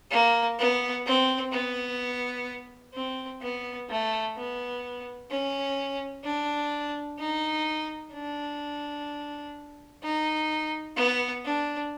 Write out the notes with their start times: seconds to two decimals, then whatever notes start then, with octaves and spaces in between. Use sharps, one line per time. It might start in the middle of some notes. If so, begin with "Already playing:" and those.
0.11 A#3
0.59 B3
1.06 C4
1.52 B3
2.94 C4
3.41 B3
3.89 A3
4.36 B3
5.30 C#4
6.24 D4
7.19 D#4
8.13 D4
10.03 D#4
10.96 B3
11.45 D4